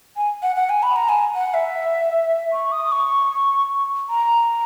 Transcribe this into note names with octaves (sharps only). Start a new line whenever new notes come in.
G#5
F#5
F#5
G#5
B5
A#5
G#5
F#5
E5
C#6
D#6
C#6
A#5